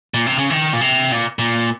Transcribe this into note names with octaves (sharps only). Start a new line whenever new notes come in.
A#2
C3
C#3
D#3
A#2
C3
A#2
A#2